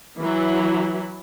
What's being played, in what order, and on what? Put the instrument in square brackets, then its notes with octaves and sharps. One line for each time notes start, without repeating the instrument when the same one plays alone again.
[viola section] E3 F#3 E4